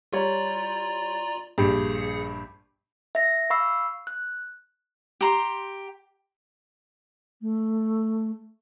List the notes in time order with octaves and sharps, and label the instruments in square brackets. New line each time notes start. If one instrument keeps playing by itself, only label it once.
[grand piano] G3 C#5 [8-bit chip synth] F4 D5 A#5
[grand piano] A#1 G2 G4 [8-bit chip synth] G#4 C#7
[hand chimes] E5 A#6
F5 B5 C#6 E6 C7
F#6
[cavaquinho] G4 A#5 C6
[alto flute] A3